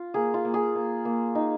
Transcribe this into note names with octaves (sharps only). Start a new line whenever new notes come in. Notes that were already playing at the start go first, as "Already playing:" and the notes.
Already playing: F4
A#3 G#4
F4
A#3
G#4
A#3
A#3
D#4